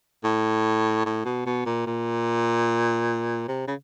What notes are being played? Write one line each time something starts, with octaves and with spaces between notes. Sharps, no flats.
A2
A2
B2
B2
A#2
A#2
C3
C#3